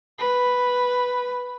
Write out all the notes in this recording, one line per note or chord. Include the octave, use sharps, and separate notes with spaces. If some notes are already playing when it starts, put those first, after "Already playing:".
B4